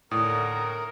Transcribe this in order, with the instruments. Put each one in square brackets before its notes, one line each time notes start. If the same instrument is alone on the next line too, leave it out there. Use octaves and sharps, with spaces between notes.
[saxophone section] D#2 D3 [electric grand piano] A2 [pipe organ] A#4 [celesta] D#6